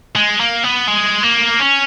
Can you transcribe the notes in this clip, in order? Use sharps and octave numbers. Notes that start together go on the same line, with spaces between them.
G#3
A#3
B3
G#3
A#3
C#4